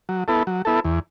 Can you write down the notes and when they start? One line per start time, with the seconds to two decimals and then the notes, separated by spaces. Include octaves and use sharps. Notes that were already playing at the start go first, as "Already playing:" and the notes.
0.09 F#3
0.28 B3 E4 A4
0.47 F#3
0.65 B3 E4 A4
0.84 E2